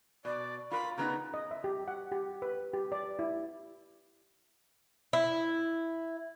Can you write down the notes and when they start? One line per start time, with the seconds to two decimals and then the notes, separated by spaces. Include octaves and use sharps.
0.25 B2 D5
0.71 F4 A#4 B5
0.98 C#3 B3 D#4 A#5
1.34 D#5
1.51 E5
1.64 G4
1.88 F#5
2.12 G4
2.42 B4
2.73 G4
2.92 D5
3.19 E4
5.13 E4